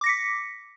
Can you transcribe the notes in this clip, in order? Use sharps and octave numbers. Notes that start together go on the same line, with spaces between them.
D6 A#6 B6 C#7